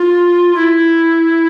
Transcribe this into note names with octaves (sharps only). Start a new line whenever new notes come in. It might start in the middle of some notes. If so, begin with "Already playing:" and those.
Already playing: F4
E4